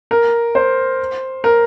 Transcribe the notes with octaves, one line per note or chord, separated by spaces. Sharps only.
A#4
C5
A#4